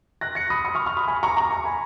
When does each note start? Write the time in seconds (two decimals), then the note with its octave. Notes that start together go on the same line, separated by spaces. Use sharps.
0.21 F#6 A#6
0.35 A#6 C#7
0.50 B5 D#6
0.64 B5 D#6
0.75 C#6 F6
0.86 C#6 F6
0.97 B5 D#6
1.07 G#5 B5
1.23 A#5 C#6
1.37 A#5 C#6
1.51 A#5 C#6
1.65 G#5 B5